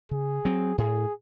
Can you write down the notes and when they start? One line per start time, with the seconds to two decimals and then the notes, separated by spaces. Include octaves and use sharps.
0.11 C#3 G#4
0.45 F#3 C4
0.78 A2 G#4